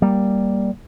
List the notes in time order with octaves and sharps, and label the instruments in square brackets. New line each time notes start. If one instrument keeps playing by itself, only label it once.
[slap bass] G3 A#3